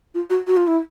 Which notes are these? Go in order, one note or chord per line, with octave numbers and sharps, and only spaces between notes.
F4
F#4
F#4
F4
E4